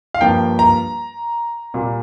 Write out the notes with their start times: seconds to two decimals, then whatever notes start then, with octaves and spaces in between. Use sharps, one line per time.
0.14 F5
0.21 G2 F3 A#3 G5
0.59 A#5
1.74 A#2 G3 A#3